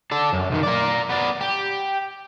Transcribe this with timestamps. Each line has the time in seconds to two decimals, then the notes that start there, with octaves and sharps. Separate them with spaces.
0.11 A4 D5
0.33 F#2
0.51 B1 D#3
0.63 A#4 D5
1.10 B3 D5
1.41 G4